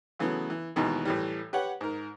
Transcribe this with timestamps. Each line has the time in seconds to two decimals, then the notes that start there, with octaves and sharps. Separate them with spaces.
0.19 C#3 E3 F#3 A3 B3
0.50 E3
0.76 D#2 B2 D#3 E3 G#3
1.05 A2 E3 G3
1.53 G4 B4 C#5 F#5
1.81 G#2 A#4